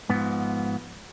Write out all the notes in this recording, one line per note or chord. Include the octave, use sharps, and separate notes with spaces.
G#2 F3 B3